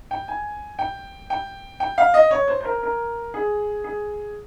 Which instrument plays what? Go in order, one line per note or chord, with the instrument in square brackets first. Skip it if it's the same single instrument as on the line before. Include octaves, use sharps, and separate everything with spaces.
[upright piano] G5
G#5
G5
G5
G5
F5
D#5
C#5
C5
C5
A#4
A#4
G#4
G#4